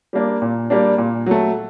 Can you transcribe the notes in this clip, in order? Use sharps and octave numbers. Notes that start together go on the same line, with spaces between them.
G3 A#3 D4
A#2
G3 A#3 D4
A#2
F#3 A3